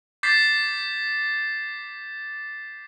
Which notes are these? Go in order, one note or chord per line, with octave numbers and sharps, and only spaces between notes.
D6 G6 A6 B6 C7